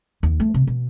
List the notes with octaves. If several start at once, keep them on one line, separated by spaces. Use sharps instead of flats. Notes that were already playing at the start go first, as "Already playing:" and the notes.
D#2
A3
C3
B2